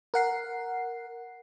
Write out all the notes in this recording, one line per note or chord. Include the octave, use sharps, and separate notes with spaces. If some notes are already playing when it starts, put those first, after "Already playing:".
A#4 F#5 C7